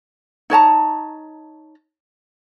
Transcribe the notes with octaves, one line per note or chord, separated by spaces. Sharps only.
D#4 C#5 A5 A#5